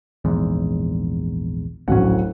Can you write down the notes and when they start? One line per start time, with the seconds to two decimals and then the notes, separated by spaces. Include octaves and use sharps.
0.25 A#1 E2 G#2
1.88 D1 A#1 A2 F#3 C#4 F#5